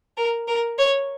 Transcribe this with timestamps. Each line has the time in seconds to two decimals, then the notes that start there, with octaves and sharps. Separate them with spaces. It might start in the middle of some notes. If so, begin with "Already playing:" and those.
0.17 A#4
0.48 A#4
0.78 C#5